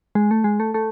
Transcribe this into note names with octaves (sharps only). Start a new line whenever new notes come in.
G#3
A3
G#3
A3
A3